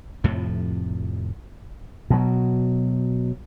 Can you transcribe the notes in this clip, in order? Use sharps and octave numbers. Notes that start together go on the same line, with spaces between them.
F2 A2 C3 F3
B2 F#3